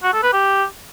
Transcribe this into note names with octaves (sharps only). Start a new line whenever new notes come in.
F#4
A4
B4
G4